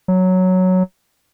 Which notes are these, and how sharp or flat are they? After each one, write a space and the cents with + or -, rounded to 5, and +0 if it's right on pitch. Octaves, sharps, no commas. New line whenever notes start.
F#3 +0